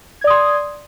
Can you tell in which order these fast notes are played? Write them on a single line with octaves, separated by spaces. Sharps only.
G#6 D5 D#6 C6